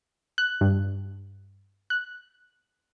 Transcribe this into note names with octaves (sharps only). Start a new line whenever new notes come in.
F#6
G2
F#6